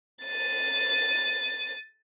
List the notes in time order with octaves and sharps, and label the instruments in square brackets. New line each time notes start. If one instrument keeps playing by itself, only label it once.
[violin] A6 D#7